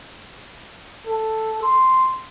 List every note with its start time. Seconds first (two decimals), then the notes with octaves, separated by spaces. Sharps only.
1.07 A4
1.63 C6